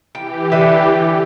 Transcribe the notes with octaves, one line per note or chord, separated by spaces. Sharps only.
E3 G4 G5
D3 B4 E5